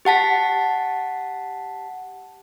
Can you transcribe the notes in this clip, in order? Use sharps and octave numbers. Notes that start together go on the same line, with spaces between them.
G4 F#5 A5 B6